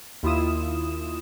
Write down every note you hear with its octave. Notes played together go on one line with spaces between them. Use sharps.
D#2 E4 F4 D#6 E7